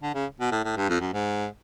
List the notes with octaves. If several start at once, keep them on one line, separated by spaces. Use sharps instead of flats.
D3
C#3
B2
A2
A2
G2
F2
F#2
G#2